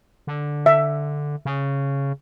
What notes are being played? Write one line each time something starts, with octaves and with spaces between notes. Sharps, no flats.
D3
E5
C#3